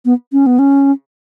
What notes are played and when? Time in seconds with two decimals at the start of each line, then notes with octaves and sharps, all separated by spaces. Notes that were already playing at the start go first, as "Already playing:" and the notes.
0.05 B3
0.33 C#4
0.46 B3
0.59 C#4